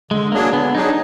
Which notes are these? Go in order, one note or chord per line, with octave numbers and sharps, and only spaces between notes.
D3 G#3
F#3 A#3 D4 G#4
D3 B3
F#3 D4 D#4 G#4